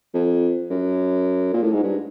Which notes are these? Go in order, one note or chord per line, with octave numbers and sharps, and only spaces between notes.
F2
F#2
A#2
A2
G#2
G2